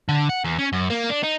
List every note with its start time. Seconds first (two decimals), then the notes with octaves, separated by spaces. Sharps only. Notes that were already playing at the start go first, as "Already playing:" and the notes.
0.09 D3
0.29 F#5
0.45 E2
0.59 C#4
0.73 F#2
0.90 A#3
1.10 D4
1.23 D#4